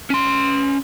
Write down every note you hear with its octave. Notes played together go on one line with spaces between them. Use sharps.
C#4 C6